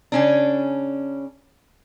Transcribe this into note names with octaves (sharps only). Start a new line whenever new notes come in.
C#3 C#4 D4